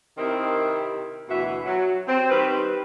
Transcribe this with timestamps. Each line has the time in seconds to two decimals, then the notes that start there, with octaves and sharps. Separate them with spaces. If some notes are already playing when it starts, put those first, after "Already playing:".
0.17 C3 D#3 C4 E4 A#4
1.29 D2 B2 E3 F#4 E5
1.65 F#3
2.07 C4
2.30 D#3 G3 C4 B4